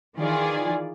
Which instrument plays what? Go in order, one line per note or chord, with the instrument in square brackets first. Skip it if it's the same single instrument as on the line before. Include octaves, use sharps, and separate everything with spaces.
[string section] D#3 E3 F4 G#4 D5